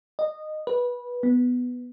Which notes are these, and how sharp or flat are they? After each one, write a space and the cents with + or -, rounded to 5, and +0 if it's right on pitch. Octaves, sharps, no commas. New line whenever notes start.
D#5 -15
B4 -15
B3 +5